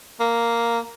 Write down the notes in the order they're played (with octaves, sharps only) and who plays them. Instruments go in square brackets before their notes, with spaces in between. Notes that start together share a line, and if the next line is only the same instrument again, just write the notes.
[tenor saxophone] A#3